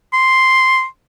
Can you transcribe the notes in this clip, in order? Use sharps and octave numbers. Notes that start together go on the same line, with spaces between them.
C6